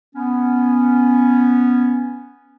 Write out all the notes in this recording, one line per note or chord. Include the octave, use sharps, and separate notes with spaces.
B3 C#4